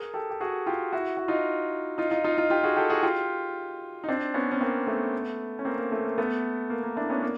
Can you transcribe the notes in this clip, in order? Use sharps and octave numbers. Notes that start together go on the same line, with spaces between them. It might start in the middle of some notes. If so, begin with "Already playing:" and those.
Already playing: G#4 A#4
G4 A4
G4
F#4 G#4
F4 G4
E4 F#4
F#4
D#4 F4
D#4 F4
D#4 F4
D#4 F4
D#4 F4
F4 G4
F#4 G#4
G4 A4
F#4 G#4
F4 G4
D#4
C4 D4
B3 C#4
C#4
A#3 C4
A3 B3
C#4
A#3 C4
A#3
A3
A#3
A3 B3
A#3
A#3
D4 E4
B3 C#4
A#3